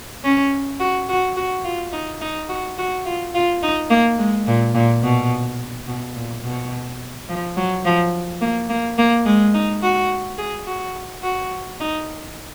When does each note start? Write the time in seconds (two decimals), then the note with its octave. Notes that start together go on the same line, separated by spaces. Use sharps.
0.24 C#4
0.80 F#4
1.09 F#4
1.37 F#4
1.64 F4
1.93 D#4
2.21 D#4
2.49 F#4
2.78 F#4
3.05 F4
3.35 F4
3.63 D#4
3.90 A#3
4.19 G#3
4.47 A#2
4.75 A#2
5.03 B2
5.88 B2
6.16 A#2
6.44 B2
7.29 F3
7.57 F#3
7.85 F3
8.41 A#3
8.69 A#3
8.98 A#3
9.26 G#3
9.54 D#4
9.83 F#4
10.38 G#4
10.67 F#4
11.23 F#4
11.80 D#4